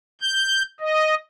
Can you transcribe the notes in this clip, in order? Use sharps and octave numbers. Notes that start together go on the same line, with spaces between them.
G6
D#5